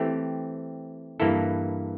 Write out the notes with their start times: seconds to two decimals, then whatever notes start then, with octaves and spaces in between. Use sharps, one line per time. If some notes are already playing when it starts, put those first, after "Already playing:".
Already playing: E3 A3 C4 G4
1.20 G2 E3 A#3 E4 A4